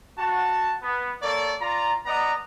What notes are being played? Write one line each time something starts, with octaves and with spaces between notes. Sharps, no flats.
F#4 A5
B3
A#3 A4 C#5 D5
F4 D5 A#5
B3 D5 D#5 F#5 A#5